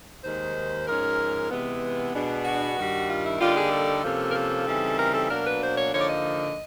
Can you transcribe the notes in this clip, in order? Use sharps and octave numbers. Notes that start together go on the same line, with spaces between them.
D#2 D#3 G#3 C5
G#2 F3 G#3 C#4 A#4
C3 E3 G#3 B3
B2 G#3 B3 D4
F#4
G2 D#3 G3
F4
E4
D3 G3 A#3 D#4 F4
G#4
A4
C3 F3 A#3 C#4
A#4
A4
C#3 E3 G3 C4 D#4
A#4
A4
B2 F#3 A#3 D4 A#4
B4
C5
C#5
D3 F3 A#3 D#4 C#5
D5
D#5